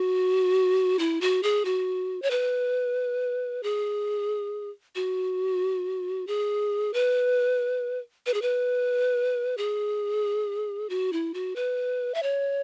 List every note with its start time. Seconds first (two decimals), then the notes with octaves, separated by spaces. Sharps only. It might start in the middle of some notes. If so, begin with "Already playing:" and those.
Already playing: F#4
0.99 E4
1.21 F#4
1.43 G#4
1.65 F#4
2.22 C#5
2.31 B4
3.63 G#4
4.95 F#4
6.27 G#4
6.94 B4
8.26 B4
8.34 G#4
8.42 B4
9.57 G#4
10.90 F#4
11.13 E4
11.34 F#4
11.56 B4
12.14 E5
12.23 C#5